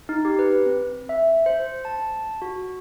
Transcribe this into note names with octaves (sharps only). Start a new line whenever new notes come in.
D#4
G4
B4
C4
E5
C5
A5
F#4